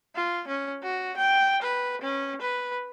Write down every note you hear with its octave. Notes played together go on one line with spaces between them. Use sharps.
F4
C#4
F#4
G5
B4
C#4
B4